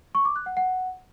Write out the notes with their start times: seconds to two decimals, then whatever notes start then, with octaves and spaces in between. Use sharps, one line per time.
0.15 C#6
0.25 D6
0.36 F#6
0.46 F#5
0.57 F#5